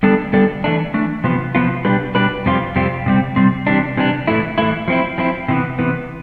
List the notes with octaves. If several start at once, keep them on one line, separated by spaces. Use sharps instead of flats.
D3 G3 B3 D4 A4
D3 G3 B3 D4 A4
E3 A3 D4
E3 A3 D4
C3 F3 B3 F4
C3 F3 B3 F4
B2 G3 D4 G4 B4
B2 G3 D4 G4 B4
F2 C3 G3 C4 F4
F2 C3 G3 C4 F4
C3 G3 C4
C3 G3 C4
C3 E3 G3 D4
C3 E3 G3 D4
A2 E3 A3 E4
A2 E3 A3 E4
F3 C4 E4
F3 C4 E4
C3 E3 B3
C3 E3 B3